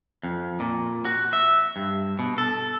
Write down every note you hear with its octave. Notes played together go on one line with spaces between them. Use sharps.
F2
A#2
F#4
E5
G2
B2
A4